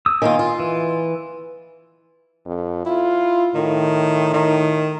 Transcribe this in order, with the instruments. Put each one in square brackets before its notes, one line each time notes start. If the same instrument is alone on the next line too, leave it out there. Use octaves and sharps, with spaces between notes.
[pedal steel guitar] D#6 E6
[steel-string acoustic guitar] D#3 A#3 F4 [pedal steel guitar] F5 G#5
[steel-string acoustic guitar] F4
[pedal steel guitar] E3
[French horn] F2
[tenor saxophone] E4 [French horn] F4
[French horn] A2 [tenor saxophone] D#3
[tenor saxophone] D#3